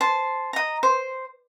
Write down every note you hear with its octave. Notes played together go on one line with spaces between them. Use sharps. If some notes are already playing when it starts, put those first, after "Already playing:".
C5 A5
D#5 A#5
C5